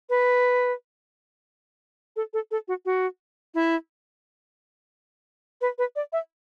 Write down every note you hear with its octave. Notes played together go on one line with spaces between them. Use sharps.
B4
A4
A4
A4
F#4
F#4
E4
B4
B4
D5
E5